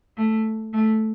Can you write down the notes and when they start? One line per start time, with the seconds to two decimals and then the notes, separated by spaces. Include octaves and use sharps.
0.17 A3
0.73 A3